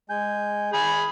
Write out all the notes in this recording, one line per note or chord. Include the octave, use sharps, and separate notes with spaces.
G#3 G#5 G6
G#4 G#5 B5